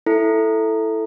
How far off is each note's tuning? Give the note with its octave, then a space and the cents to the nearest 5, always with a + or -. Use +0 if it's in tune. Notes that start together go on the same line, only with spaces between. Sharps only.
E4 +0 A4 +0